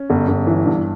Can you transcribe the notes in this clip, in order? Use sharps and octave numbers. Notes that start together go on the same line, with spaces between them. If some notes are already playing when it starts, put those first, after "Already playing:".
Already playing: C#4
G1
G1
E3
G2